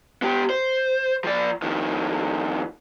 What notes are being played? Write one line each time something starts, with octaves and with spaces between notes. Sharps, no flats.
B3 G4
C5
F3 D5
F2 D#3